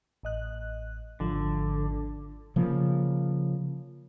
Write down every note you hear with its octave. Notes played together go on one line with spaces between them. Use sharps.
A1 D#5 F#6
G#1 D3 F3
C#3 F3 A#3